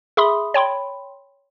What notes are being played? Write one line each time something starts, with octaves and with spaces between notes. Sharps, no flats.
G#4 E5 B5 C6 D#6
C#5 G5 B5 C6